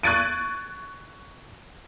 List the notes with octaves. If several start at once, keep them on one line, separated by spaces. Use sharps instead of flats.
C#6 F#6 G#6 A6 D7 D#7